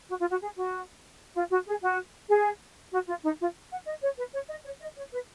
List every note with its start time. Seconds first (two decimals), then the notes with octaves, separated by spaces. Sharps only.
0.09 F#4
0.20 F4
0.30 F#4
0.41 G#4
0.57 F#4
1.35 F4
1.51 F#4
1.67 G#4
1.82 F#4
2.29 G#4
2.93 F#4
3.08 F4
3.24 D#4
3.40 F4
3.71 F#5
3.86 D#5
4.02 C#5
4.17 B4
4.33 C#5
4.49 D#5
4.64 C#5
4.80 D#5
4.95 C#5
5.12 B4